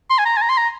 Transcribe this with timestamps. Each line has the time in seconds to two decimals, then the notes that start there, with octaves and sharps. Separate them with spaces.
0.10 C6
0.18 G#5
0.25 A#5
0.37 G#5
0.42 A#5
0.49 C6
0.57 A#5